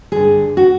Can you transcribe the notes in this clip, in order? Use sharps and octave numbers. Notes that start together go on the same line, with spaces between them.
G2 D3 G#4
F#4